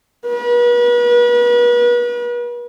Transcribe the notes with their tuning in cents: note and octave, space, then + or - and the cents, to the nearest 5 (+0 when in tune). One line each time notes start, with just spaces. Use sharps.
B4 -40